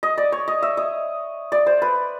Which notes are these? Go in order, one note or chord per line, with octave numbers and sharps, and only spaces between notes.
D#5
D5
C#5
D#5
E5
D#5
D5
C5
B4